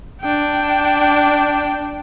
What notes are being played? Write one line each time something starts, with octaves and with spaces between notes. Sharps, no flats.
D4 G5